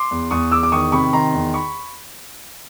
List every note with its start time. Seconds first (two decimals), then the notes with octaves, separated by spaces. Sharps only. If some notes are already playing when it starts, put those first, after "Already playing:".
Already playing: C6 D6
0.11 E2
0.31 E2 C#6 D#6
0.51 E2 D6 E6
0.63 D6
0.72 D#3 C#6 D#6
0.92 C3 B5 C#6
1.13 D#3 A#5 C6
1.33 E2
1.54 B5 C#6